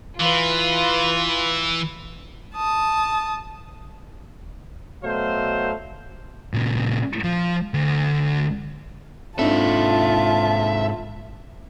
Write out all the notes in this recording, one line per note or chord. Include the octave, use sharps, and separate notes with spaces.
E3 F4 B4
A5 D#6
B2 F#3 A3 C5 F5
A#2 C#3
F3
D2
G#2 C4 D4 D#4 F4 A4 E5 A5